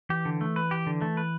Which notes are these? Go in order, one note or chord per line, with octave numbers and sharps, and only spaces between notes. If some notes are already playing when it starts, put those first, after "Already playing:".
E3 G4
D3
A3
B4
G4
D3
A3
B4